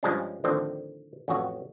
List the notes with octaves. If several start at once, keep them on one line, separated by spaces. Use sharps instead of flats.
G2 F3 G#3 C#4 D4
A2 D3 D#3 F3 C4
A1 F2 F#3 F#4 C#5